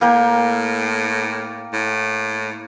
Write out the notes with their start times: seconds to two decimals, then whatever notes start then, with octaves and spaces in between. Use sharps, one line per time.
0.01 A2 A#3 A#4 G5
1.73 A2